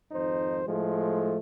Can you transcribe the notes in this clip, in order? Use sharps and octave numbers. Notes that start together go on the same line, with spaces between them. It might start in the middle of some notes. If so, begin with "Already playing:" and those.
G#1 F2 D#4 C5
A2 F3 G#3 A3